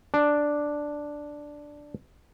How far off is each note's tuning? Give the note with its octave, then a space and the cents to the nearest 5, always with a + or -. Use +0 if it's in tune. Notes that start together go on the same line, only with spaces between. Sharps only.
D4 +0